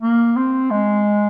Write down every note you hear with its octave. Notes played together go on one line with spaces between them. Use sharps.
A#3
C4
G#3